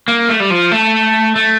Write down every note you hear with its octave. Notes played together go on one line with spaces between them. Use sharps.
A#3
A3
G3
F3
A3
A3